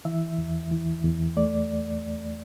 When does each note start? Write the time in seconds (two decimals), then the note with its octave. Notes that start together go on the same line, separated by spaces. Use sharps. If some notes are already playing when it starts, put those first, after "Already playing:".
0.05 E3 E5
0.38 E2
0.71 E3
1.04 E2
1.37 A3 D5